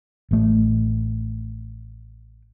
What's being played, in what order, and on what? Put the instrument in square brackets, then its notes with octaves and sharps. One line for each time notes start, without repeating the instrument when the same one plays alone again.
[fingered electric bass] A1 A3